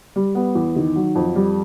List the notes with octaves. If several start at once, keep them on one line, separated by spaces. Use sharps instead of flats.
G3
B3
E2
D#3
F#3
F2
G3